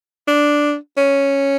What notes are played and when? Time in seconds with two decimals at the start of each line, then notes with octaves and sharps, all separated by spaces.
0.28 D4
0.97 C#4